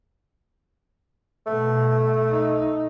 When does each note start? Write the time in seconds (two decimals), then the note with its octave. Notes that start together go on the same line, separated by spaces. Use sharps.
1.46 B2 A3
2.30 D#4